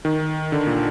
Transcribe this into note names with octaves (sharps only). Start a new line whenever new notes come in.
D#3
D3
A#2